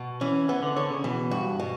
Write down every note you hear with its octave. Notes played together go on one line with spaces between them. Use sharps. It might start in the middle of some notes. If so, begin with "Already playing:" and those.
Already playing: B2
E3 C#4
E3 B3
D3
D3 C#5
C#3
B2 E3
G2 F#4
B2